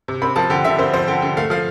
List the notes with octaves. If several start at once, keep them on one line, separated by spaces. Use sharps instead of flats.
C3
C4 B5
F3 A5
D3 G5
D3 E5
C4 C5
F3 C5
D3 G5
D3
A3 F5
F3 F5